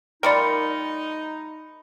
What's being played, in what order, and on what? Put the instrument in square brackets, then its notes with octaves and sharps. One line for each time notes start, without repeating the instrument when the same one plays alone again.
[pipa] G3 A3 F4 [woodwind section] D#4 [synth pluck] A#4 D5 [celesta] B5 C#7